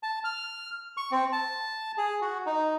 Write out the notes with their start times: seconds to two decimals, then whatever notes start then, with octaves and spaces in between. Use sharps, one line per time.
0.03 A5
0.24 F6
0.97 C#6
1.11 C4
1.32 A5
1.97 G#4
2.22 F#4
2.46 D#4